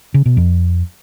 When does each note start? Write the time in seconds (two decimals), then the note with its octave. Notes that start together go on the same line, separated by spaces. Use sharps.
0.14 C#3
0.26 B2
0.37 F2